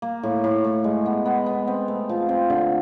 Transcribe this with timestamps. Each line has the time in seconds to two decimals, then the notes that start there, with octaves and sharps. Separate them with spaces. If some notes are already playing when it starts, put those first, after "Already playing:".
0.02 A#3
0.23 A2
0.44 A2
0.64 A2
0.84 G#3
1.06 B3
1.26 B3
1.46 B3
1.68 C4
1.88 A3
2.09 F3
2.29 C4
2.50 D3